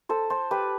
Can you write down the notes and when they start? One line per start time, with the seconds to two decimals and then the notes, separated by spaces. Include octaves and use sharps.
0.09 A4 C5
0.30 A4 C5
0.51 G4 B4